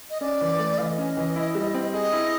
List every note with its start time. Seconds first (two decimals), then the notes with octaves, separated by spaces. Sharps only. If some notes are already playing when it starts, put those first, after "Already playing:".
0.10 D#5
0.21 C#4 D5
0.41 E3
0.59 A3
0.78 E3 D#5 F5
0.98 C#4
1.17 E3
1.36 E4
1.55 G3
1.74 C4
1.93 G#4 D#5
2.13 E4